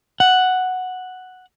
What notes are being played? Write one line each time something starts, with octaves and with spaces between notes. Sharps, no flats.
F#5